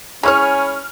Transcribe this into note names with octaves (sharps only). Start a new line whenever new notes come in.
G#3 C#4 E4 C#5 G#5 B5 C#6 F6